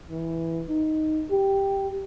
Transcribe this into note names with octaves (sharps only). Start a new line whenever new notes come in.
E3
D#4
G4